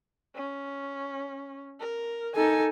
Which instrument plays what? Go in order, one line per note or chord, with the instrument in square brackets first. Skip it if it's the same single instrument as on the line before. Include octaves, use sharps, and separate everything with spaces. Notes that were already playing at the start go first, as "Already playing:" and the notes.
[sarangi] C#4
A#4
[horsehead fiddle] D#4 A4 [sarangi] G#5